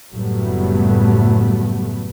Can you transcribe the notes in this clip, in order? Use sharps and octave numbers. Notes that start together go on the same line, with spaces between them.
F#1 A2 F#3 G3 A3 B3